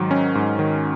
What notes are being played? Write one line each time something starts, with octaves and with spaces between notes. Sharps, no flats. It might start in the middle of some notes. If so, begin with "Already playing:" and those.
Already playing: G#2 D#3 F#3
C#4
G#2
D#3